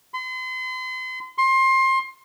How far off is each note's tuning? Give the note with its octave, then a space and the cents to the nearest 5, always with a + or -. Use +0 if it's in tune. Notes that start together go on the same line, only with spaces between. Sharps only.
C6 -40
C6 +25